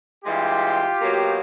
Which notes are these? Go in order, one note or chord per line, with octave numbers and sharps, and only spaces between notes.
G2 E3 G#3 F4 G4
B2 F#3 A#3